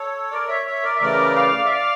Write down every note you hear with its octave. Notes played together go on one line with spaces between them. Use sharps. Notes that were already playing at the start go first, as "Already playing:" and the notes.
Already playing: A4 C#5
A#4 D5
C#5 E5
C#5 E5
A#4 D5
E5
C#3 E3 A3 A#4 D5
D5 F5
E5
D5 F5